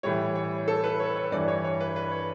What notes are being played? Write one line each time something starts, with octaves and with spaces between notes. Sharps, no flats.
A2 E3 G3 C#5
C#5
A4
B4
C#5
C#5
G2 E3 G3 D5
C#5
C#5
B4
B4
C#5